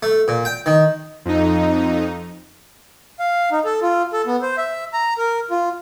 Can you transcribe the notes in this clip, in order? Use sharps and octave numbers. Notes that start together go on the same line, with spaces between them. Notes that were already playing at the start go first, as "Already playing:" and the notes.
A3
A#2
G5
D#3
F2 D#4
F5
D#4
A4
F4
A4
B3
C5
E5
A#5
A#4
F4